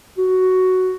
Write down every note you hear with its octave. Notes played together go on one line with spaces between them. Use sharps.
F#4